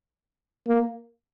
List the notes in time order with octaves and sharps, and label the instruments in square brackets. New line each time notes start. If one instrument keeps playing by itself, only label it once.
[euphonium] A#3